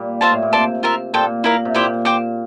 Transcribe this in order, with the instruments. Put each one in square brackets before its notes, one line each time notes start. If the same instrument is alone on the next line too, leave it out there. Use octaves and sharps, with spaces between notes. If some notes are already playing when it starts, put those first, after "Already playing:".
Already playing: [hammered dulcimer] A#2 G3
[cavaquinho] F4 C5 E5 A5
[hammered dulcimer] A2
A#2
[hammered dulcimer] C3 [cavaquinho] D5 A5 C6
[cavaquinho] F4 A#4 E5
[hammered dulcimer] A#2 [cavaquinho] A4 C5 G5
[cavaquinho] E4 A#4 F5
[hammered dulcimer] C3
[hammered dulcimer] A#2 [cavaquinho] E4 G4 C5 G5
[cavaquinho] C5 G5 D6